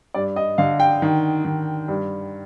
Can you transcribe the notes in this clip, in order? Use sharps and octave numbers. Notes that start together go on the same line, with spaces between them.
G2 D5
D#5
D3 F5
G5
D#3
D#3
G2